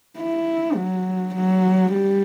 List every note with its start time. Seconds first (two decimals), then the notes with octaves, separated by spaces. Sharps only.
0.18 E4
0.76 F#3
1.35 F#3
1.93 G3